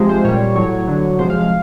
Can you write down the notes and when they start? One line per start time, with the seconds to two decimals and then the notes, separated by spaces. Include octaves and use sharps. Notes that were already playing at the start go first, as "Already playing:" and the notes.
Already playing: C3 F3 G#3
0.09 C5
0.25 A#2 G3 C#5
0.56 A2 F#3 C#5
0.88 D3 F#3
1.19 C3 F3 G#3 C5
1.30 F5
1.41 F5